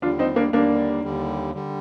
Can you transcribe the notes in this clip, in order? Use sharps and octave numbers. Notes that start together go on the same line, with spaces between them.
D#2 D3 G3 D4 F4
C4 D#4
A#3 D4
D#2 D3 G3 A#3 D4
D#2 D3 G3
D3 G3